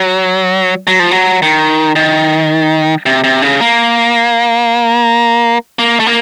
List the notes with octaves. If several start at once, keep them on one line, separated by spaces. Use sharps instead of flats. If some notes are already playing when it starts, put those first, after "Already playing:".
Already playing: F#3
F#3
F3
F#3
D#3
D#3
C3
C3
C#3
A#3
A#3
A3
A#3